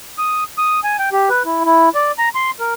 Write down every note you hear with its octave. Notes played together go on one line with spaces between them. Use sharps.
D#6
D#6
G#5
G5
G4
B4
E4
E4
D5
A#5
C6
A#4